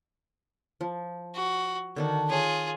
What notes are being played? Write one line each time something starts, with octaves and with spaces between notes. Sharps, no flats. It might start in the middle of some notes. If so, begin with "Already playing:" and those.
F3
F#4
D3 D#3 D4 F#4
F4 G#4 C#5